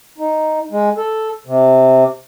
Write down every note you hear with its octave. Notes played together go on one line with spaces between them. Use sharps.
D#4
G#3
A4
C3